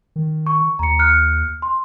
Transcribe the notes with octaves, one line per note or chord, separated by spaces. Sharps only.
D#3
C#6
D#2 A#5 C#7
F6 F#6 C#7
C6